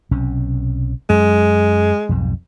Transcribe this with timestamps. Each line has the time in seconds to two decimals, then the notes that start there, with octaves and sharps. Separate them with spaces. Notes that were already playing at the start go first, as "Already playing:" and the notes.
0.11 B1 C3 C#4
1.10 F#2 G#3
2.09 B1 F2 G#2